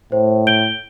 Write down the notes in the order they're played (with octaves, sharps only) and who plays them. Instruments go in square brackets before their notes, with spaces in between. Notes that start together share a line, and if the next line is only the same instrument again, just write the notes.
[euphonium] A2 [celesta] C5
[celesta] G6 D7 G7